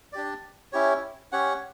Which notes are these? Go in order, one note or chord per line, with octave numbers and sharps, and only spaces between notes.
D4 G4 D5
C#4 E4 G4 C#5
C#4 G4 C#5 F#5